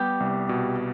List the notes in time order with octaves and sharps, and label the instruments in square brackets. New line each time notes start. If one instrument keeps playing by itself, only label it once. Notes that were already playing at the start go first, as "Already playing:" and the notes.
Already playing: [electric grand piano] G3 B3 [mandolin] G4
[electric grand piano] C2
B2